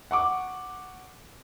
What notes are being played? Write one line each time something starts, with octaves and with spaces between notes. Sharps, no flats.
F#5 C#6 D6